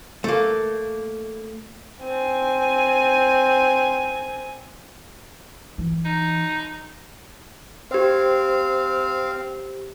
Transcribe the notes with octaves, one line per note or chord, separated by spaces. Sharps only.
A3 A#3
C4 G#5
E3
D#4
C4 G4 C5 F5